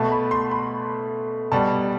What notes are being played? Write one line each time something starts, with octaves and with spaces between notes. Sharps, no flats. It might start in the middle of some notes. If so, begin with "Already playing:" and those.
Already playing: B2 A3 A5
B5
C6
B5
B2 G3 A5